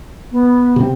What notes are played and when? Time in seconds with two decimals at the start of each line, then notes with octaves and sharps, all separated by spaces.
0.32 B3
0.76 C3 C4